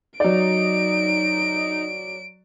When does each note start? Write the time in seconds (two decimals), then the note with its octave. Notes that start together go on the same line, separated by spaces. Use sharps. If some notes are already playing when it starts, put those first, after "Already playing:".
0.20 F#3 D#4 D5 D7